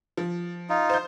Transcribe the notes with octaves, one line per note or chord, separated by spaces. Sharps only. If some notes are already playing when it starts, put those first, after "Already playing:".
F3
D#4 F4
C5 G6